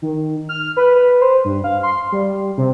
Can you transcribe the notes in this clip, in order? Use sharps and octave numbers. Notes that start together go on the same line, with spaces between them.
D#3
F6
B4
B4
C5
G2
F5
C6
G3
C3